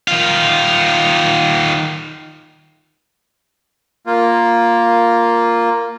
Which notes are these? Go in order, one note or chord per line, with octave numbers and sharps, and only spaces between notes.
D#3 F4
A#3 F4